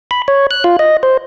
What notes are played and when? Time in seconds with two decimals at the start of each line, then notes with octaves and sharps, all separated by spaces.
0.11 B5
0.28 C#5
0.51 F#6
0.64 F4
0.79 D#5
1.03 C5